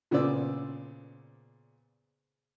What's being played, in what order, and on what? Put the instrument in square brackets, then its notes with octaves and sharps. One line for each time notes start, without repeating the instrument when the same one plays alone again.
[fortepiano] A#2 C#3 B3 C5 D5 E6